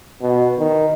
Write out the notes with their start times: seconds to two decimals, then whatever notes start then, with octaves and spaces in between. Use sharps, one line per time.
0.22 B2
0.59 D#3